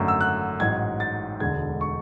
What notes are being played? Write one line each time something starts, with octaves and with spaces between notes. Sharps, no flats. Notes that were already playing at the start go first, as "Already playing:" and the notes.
Already playing: G#1 F#2 D3 F#3 A3
E6
F#6
A1 G#2 F#3 G#6
A6
E1 D2 D3 G#3 G#6
C#6